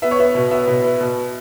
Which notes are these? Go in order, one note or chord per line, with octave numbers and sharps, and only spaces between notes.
B3 E5
C#5
B3 E5
B2
B3 E5
B2
B3
B2